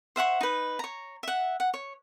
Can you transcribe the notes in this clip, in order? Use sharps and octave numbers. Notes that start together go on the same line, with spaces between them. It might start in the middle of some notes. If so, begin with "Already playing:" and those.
C5 E5 F#5 C#6
D#4 B4
C#5 A#5
E5 F#5
F#5
C#5